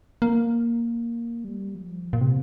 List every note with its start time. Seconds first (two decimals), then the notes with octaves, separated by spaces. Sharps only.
0.22 A#3
1.44 G3
1.75 F3
2.13 A#2
2.21 C3